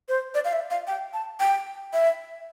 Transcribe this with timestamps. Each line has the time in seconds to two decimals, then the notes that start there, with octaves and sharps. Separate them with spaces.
0.09 C5
0.35 D5
0.45 F5
0.53 E5
0.70 F5
0.87 G5
1.14 A5
1.40 G5
1.93 E5